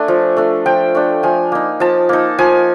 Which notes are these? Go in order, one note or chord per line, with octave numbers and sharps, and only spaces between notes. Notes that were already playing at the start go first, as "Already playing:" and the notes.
Already playing: A3 D4 G#5
F3
A3 D4
F3 G5
A3 D4
F3 G#5
A#3 D#4
F3 A5
A#3 D#4
F3 G#5